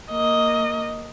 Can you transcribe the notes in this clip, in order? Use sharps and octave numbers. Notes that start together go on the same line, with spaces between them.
A#3 D#5